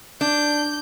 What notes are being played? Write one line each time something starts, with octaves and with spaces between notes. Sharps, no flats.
D4 G6